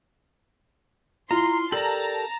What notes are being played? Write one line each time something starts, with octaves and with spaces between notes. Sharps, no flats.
E4 F4 A#5 C6
G4 A4 A#4 D5 A5 A#5 F#7